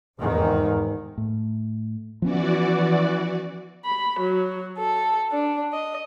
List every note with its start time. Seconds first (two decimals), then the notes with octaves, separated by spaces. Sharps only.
0.19 F1 E2 G#2 D#3
1.18 A2
2.22 E3 F3 B3 C#4 F#4 D5
3.86 B5
4.20 F#3
4.78 A4
5.31 D4
5.72 D#5